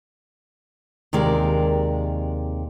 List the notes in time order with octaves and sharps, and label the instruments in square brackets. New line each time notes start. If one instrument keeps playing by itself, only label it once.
[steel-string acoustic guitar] D#2 C3 G#3 A#4 D5